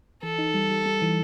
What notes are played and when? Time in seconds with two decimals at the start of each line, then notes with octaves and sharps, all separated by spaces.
0.23 E3 A4
0.38 D#4
0.54 G3
0.70 G3
0.86 G3
1.02 E3